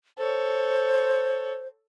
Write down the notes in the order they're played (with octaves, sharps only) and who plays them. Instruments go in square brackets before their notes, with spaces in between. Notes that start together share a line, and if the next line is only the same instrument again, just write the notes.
[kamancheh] A4 C#5 [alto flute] C5